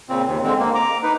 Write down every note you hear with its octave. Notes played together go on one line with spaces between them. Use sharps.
A#2 C#3 C4
D#2
D3 G#3 C4
A#3
A#5 D6
D#4 B4